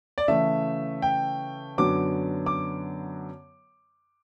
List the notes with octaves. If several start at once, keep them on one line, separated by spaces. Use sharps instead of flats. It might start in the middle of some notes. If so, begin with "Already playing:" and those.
D5
C#3 E3 A3 E5
G5
F#2 D3 F#3 B3 D6
D6